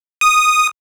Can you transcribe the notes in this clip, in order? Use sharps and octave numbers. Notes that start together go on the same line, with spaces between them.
D#6